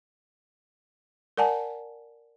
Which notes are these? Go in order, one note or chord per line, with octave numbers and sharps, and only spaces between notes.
A#4 D5 F#5 G#5 A5